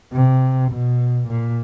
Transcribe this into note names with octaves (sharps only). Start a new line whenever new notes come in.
C3
B2
A#2